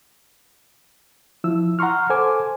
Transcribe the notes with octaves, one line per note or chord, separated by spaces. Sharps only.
F3 E4 E6
F#5 A#5 C6 C#6 F6
A4 C5 G#5 D6